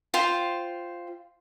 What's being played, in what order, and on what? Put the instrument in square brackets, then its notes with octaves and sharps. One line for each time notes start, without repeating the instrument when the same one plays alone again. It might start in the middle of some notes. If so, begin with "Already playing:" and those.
[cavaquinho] F4 C5 G5